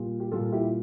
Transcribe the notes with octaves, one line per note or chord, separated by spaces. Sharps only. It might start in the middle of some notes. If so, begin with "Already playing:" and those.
Already playing: A#2 G3
G4
A#2 G3 F4 A4
E4 G4